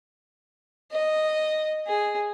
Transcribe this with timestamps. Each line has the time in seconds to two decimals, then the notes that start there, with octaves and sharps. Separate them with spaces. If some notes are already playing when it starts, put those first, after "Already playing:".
0.92 D#5
1.87 G#4